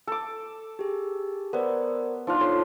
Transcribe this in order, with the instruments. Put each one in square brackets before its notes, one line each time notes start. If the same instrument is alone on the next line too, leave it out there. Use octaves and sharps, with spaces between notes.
[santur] A4 D6
[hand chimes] G4 G#4
[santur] B3 [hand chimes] A#4 C5 D5
[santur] F3 D4 F4 [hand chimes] D#4 F#6
[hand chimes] A4 C#5 [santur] C6